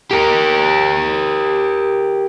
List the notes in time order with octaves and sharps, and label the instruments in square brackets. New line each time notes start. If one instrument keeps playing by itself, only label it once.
[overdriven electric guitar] G4 A#4